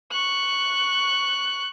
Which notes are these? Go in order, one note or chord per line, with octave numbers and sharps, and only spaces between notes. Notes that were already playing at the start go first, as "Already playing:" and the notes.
C#6 F#6